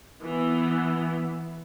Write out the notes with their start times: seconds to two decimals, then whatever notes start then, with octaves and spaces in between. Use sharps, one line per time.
0.22 E3 B3